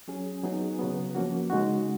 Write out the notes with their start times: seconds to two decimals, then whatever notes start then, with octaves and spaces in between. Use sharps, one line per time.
0.08 F#3 C#4 G#4
0.44 F#3 B3 D#4 G#4
0.79 C#3 F#3 B3
1.15 F3 A#3 C#4 F#4
1.50 C#3 G#3 D#4 F#4